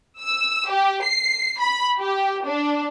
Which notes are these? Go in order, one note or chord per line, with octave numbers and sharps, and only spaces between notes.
E6
G4
C7
B5
G4
D4